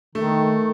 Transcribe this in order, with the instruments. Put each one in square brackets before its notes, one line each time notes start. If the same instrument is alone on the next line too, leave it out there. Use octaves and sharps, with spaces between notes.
[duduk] D#3 [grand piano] A3